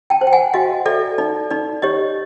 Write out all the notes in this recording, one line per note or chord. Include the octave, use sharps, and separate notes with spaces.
G5 A5
C5
G5
F#5 G#5
F#4 D#5 F5
A4 D5 E5
D#4 D5
D#4 D5
G4 C#5 D#5